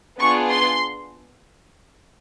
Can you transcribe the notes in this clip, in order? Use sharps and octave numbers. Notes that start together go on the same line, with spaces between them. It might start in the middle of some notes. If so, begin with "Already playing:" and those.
B3 D4 F4 G#4 C#6
C6